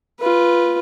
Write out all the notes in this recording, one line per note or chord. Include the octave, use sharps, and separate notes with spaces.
F4 B4